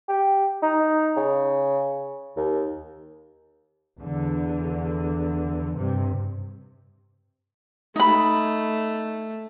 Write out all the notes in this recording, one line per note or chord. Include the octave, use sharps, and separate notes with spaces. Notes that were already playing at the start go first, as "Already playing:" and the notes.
G4
D#4
C#3
D#2
E2 D3
G2 C3
A3 D#4 B5